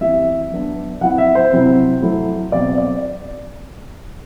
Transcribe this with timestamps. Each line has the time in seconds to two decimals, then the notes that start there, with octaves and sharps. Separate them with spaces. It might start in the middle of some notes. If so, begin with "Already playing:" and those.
0.01 E3 G3 C4 E4 E5
0.52 F#3 B3 D4
1.01 F#3 C4 E4 F#5
1.18 E5
1.35 C5
1.52 C3 F#3 C4 E4
2.02 F#3 A3 E4
2.52 B2 F#3 C4 D5
2.78 D5